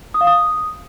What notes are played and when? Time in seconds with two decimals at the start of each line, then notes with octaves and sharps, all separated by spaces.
0.14 D#6
0.21 F5
0.27 D#6